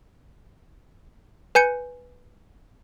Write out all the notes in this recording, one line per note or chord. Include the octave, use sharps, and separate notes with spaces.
B4 G#5 G6 C#7